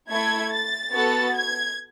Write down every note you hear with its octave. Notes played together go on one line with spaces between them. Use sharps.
A3 E4 A4 G#6
A6
B3 F#4 A4 A6
G#6